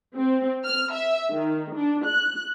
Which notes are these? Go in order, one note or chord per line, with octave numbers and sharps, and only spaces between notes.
C4
F6
E5
D#3
D4
F#6